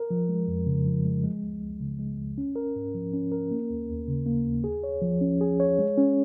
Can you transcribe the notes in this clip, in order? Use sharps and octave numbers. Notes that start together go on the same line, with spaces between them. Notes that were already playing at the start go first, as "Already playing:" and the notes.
Already playing: A#4
F3
G#3
F2
C#3
F3
G#3
G#3
C#2
C#2
C#3
G#3
C#2
C#4
A#4
G#2
F3
C#4
A#4
A#3
D#2
D#2
C#3
A#3
D#2
G#4
C#5
F3
C#4
G#4
C#5
G#3
C#4